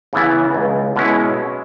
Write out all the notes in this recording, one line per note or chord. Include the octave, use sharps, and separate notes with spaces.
C#3 E3 B3 E4
C#2
B2 G#3 C#4 E4